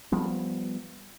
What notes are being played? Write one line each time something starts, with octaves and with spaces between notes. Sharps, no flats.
F3 G3 B3